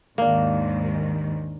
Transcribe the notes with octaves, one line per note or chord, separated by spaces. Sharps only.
D#2 G#2 D#3 A#3 D4